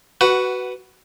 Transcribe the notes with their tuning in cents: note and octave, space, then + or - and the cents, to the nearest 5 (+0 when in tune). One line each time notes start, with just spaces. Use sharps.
F#4 +15 B4 +0 F#5 +0